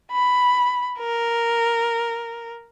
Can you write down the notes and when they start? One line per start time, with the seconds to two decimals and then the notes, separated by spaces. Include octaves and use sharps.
0.12 B5
0.99 A#4